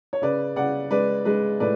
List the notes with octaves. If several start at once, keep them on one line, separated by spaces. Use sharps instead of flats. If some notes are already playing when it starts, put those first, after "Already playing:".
C#5
C#3 B4 D5
C#3 D5 F#5
G#3 B4 D5
G#3 B4
A2 B4 D5